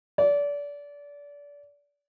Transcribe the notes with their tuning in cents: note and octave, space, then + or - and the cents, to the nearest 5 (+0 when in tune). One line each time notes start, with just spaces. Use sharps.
D5 -30